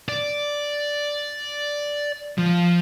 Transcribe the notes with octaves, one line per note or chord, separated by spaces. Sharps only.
D5
F3